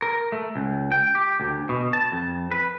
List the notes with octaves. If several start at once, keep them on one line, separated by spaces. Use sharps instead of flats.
A#4
A3
C#2
G5
G4
D2
B2
A5
F2
B4